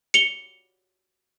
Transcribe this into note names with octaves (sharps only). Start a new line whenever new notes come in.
C#7 F7 G7